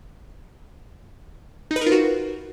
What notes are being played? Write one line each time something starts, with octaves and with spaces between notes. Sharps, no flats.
D#4
B4
A#4
F4
F#4